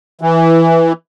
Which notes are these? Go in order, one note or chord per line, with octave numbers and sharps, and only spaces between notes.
E3